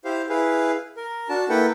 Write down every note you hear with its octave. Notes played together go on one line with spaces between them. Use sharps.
E4 G4 C5 F5
E4 G#4 B4 F5
A#4
D4 F#4 A5
A#3 E4 A4 B4 F#5 G5